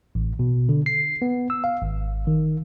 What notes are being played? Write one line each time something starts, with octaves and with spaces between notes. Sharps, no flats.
A1
B2
D3
C7
B3
E6
F5
G#1
D#3